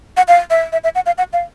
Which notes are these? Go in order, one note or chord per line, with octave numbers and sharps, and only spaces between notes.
F#5
F5
E5
E5
E5
F#5
F5
F#5
F5